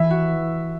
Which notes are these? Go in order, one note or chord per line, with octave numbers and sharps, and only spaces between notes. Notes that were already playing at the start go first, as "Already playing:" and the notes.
Already playing: E3 E5
F#4